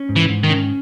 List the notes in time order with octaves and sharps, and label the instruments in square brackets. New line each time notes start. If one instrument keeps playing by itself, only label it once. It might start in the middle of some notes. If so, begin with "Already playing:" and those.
Already playing: [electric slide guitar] C#4
G#2
[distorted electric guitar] E3
[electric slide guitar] G#2
[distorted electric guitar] D#3
[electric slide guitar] C#4